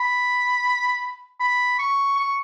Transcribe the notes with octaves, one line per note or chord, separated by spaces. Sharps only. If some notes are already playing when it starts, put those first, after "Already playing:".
Already playing: B5
B5
C#6
C#6